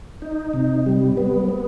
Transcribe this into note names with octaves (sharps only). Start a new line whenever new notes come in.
D#4
C3
G3
B3
B3